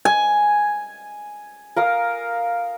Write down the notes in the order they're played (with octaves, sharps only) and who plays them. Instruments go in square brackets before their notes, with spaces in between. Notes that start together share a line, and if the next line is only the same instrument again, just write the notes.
[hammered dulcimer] G#5
[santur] A#4 F5 D#6